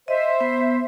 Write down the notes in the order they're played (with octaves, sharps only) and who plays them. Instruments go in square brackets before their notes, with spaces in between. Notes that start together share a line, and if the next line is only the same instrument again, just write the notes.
[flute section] C5 E5 [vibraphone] D#5
[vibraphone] B3